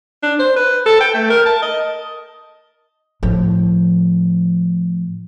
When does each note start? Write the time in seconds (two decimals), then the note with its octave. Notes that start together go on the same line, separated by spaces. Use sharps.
0.23 D4
0.39 C5
0.56 B4
0.86 A4
1.01 G5
1.14 A3
1.30 A#4
1.46 A5
1.62 D#5
3.23 A2 F3